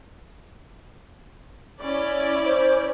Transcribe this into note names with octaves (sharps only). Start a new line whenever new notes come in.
C#4 E4 D5
C5